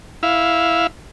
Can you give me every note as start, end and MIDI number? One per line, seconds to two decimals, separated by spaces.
0.23 0.87 64
0.23 0.87 77